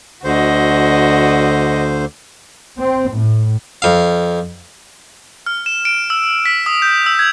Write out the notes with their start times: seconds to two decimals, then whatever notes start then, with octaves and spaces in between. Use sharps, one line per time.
0.24 D2 D3 F#4 C5 D#5
2.79 C4
3.16 A2
3.82 F2 F5
5.46 F6
5.66 E7
5.85 D7
6.10 E6
6.46 B6
6.66 D#6
6.82 G6
7.06 E6
7.19 G#6